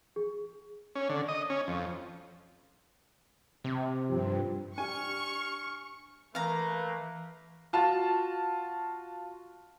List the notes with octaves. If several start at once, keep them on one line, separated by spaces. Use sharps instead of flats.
G#4
C#4
D3
D#5
C#4
F2
C3
G2 F3 C4 G4
D4 G4 G#5 C#6 F6
E3 A3 A#3 B4 F5 A#5
F4 F#4 A5